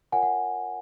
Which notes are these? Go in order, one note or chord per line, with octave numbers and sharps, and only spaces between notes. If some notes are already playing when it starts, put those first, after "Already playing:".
F4 A#4 C#5 F#5 G#5
F#5